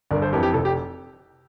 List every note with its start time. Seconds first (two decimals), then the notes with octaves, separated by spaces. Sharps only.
0.11 G1 A#4 D5
0.22 A4 C5
0.32 F2 E3 G4 A#4
0.43 G4
0.54 F1 A4
0.65 G4